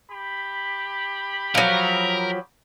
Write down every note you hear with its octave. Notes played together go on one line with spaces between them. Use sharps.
G4 B5
F3 F#3 A#4